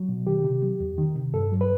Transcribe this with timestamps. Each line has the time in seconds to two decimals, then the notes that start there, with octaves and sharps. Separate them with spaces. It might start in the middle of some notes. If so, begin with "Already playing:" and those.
Already playing: F#3
0.09 B2
0.27 D#3 G4
0.44 C3
0.63 F#3
0.80 E2
0.98 D#3
1.16 C3
1.34 G2 A4
1.52 F#3
1.61 B4